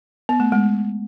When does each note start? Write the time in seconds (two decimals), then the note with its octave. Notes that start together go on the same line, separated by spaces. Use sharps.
0.29 B3
0.40 A3
0.52 G#3